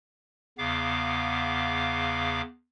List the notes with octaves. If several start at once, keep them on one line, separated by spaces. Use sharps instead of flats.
E2 C#3 B3 F5 D6